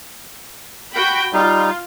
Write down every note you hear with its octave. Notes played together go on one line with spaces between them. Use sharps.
F#4 G5 B5
G3 D#4 F4